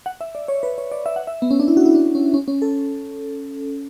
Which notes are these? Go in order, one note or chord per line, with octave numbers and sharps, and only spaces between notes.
F#5
E5
D5
C#5
B4
C#5
D5
E5
F#5
E5
B3
C#4
D4
E4
F#4
E4
D4
C#4
C#4
C#4
A4